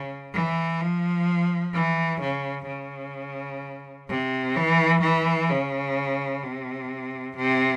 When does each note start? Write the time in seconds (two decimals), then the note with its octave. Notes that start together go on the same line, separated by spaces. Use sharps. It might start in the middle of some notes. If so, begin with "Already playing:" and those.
Already playing: C#3
0.34 E3
0.80 F3
1.74 E3
2.21 C#3
2.67 C#3
4.09 C3
4.56 E3
5.02 E3
5.49 C#3
6.43 C3
7.37 C3